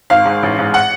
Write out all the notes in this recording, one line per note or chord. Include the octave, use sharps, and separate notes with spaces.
G#1 F5
G#2
A1
G#2
F#5